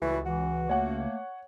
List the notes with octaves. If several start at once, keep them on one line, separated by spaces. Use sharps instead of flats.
C#2 E3 G3 F#4 A4
E3 F#4
A3 A#3 C#5 F#5